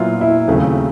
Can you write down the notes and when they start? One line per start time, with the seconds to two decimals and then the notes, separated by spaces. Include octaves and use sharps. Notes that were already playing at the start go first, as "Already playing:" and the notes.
Already playing: A#2 F#3 B3 E4 F4
0.21 E4
0.47 D#2 C#3 F#3 A3 C4